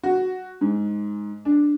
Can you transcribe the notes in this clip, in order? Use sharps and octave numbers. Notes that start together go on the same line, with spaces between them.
F#4
G#2
D4